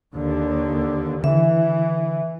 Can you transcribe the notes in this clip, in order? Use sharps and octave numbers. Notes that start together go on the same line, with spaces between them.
D#2 D3
D3 E3 E5